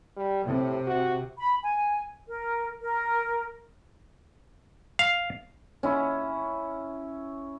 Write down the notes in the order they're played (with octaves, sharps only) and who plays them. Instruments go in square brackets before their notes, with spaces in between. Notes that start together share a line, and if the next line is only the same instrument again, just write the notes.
[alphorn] G3
[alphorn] A2 [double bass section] C3
[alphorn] F#4
[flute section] B5
G#5
A#4
A#4
[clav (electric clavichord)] F5
[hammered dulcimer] C#4 E4